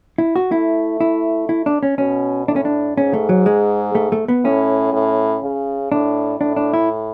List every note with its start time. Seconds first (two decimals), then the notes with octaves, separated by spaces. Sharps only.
0.18 E4
0.36 F#4
0.51 A3 E4
1.01 E4
1.49 E4
1.66 D4
1.83 C#4
1.98 B2 C#4
2.47 A2 D4
2.56 C#4
2.65 D4
2.97 G#2 C#4
3.13 A3
3.29 F#3
3.46 G#3
3.95 A3
4.12 A3
4.28 B3
4.44 A2 C#4
4.93 A2
5.43 C#3
5.92 A2 D4
6.41 A2 D4
6.56 D4
6.74 E4